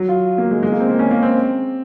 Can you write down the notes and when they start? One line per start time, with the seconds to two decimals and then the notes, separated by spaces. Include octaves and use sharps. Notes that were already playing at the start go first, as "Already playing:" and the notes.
Already playing: F#3
0.09 F4
0.38 A#3
0.51 G#3
0.63 G#3
0.72 A#3
0.80 C4
0.89 A#3
0.99 C#4
1.11 A#3
1.22 C4